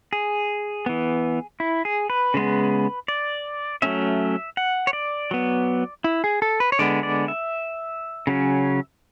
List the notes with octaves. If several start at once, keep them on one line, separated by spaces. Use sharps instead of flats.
G#4
E3 B3
E4
G#4
B4
C#3 G#3 B3
D5
F#3 A3 C#4 E5
F#5
C#5
D5
F#3 B3
E4
G#4
A4
B4
C#5
D3 G#3 B3 D5
D5
E5
C#3 F#3 C#4